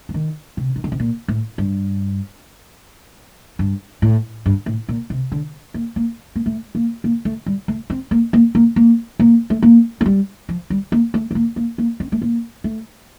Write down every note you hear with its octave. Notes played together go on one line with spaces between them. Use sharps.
F3
D#3
C3
D#3
D3
C3
A#2
A2
G2
G2
A2
G2
A2
A#2
C3
D3
A#3
A#3
A#3
A3
A#3
A#3
A3
G3
A3
C4
A#3
A#3
A#3
A#3
A#3
A3
A#3
A3
G3
F3
G3
A#3
A3
A3
A#3
A#3
A#3
C4
A3
A#3
A3